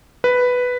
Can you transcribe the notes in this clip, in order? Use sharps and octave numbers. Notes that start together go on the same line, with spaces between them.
B4